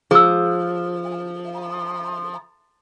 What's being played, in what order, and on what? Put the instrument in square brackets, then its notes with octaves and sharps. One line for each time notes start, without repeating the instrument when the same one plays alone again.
[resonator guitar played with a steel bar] F3 [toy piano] G#4 E6